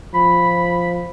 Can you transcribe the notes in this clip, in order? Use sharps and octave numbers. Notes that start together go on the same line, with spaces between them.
F3 B5